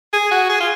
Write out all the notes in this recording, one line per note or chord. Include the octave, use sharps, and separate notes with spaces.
G#4
F#4
G#4
F4